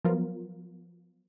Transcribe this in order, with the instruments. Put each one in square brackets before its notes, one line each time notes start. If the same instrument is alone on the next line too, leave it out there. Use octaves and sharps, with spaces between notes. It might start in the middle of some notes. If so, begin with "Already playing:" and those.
[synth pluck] F3 F#3 B3 F4 A#4